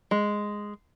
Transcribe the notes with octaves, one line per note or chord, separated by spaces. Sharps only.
G#3